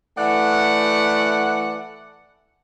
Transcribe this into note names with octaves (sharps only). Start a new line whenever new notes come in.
E3 A3 D5 F#5